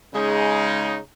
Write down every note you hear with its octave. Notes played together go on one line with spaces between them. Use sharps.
C#3 G#3 D#4